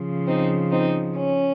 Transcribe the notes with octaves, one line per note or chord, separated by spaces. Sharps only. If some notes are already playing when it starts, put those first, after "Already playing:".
Already playing: C#3 F3
C4 D#4
C4 D#4
C#4